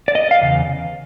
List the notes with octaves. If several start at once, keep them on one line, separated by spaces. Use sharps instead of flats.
D5
D#5
F5
E2 C#3